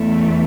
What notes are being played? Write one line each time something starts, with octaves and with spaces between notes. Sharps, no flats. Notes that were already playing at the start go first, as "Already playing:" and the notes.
Already playing: E2 E3 A3